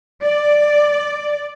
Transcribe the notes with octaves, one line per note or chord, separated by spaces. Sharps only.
D5